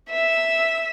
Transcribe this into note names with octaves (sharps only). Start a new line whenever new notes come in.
E5 E6